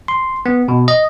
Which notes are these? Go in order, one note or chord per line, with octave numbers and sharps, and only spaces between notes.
C6
B3
B2
D#5